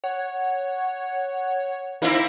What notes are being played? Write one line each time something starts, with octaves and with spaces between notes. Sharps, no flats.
C#5 F#5
A#3 C4 D#4 E4